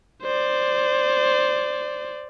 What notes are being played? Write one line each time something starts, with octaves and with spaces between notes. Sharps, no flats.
C5 D5